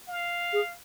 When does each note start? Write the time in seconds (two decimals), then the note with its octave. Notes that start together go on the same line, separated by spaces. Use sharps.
0.08 F5
0.53 G#4